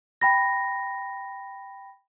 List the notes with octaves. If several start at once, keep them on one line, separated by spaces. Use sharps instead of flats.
G5 B5 A#6